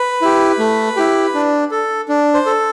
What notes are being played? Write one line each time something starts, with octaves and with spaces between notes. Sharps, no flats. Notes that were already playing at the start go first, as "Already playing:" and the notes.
Already playing: B4
E4 G4
A3
E4 G4
D4
A4
D4
C5
A4